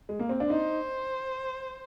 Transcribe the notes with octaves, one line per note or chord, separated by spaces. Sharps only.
G#3
A#3
C4
D4
D#4 C5